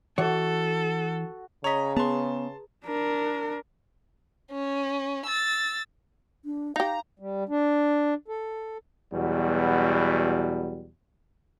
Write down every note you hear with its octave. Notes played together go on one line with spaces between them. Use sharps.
E3 F#4 A4 C#5
C#3 C#5 D#5 A#5 B6
B3 G#4 B4 A5 C6
D4 A#4
C#4
E6 A6
D4
D#4 G4 F5 A#5
G3
D4
A4
E2 B2 F#3 G3